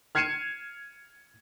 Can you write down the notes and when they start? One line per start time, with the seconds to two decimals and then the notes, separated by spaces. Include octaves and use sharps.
0.15 F6 G#6 C7 C#7 D#7 E7